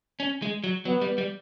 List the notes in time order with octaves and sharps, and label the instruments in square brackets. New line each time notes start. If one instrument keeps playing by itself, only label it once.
[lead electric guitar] C#4
G#3
F#3
[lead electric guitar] F#3 [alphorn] B3
[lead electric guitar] G3
G3